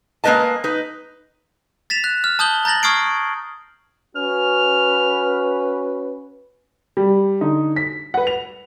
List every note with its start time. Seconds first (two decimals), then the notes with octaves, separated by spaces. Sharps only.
0.24 G#3 A#3 D#4 B4 D#5 A5
0.64 D#4 B4
1.90 A6 B6 E7 F7
2.04 F#6
2.24 F6
2.39 A5 D#6 G6 F#7 G7
2.65 A#5 G6 A6 A#6 F#7
2.83 C#6 D#6 F6 G#6 C7 D7
4.16 C#4 F#4 B4 F6
6.97 G3
7.41 D3 D#4
7.76 B6
8.14 B4 F#5
8.27 F7